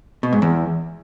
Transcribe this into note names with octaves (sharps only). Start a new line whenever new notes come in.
B2
G#2
E2